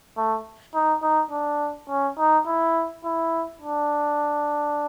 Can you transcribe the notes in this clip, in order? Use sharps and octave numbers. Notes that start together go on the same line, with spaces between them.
A3
D#4
D#4
D4
C#4
D#4
E4
E4
D4